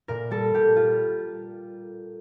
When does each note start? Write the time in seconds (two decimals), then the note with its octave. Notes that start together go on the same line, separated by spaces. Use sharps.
0.08 A#2 A#4
0.31 G3 A4
0.54 A#2 G4
0.76 G3 F4